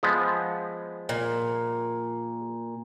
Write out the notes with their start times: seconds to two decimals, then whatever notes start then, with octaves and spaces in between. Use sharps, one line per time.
0.03 F3 G#3 B3
1.09 A#2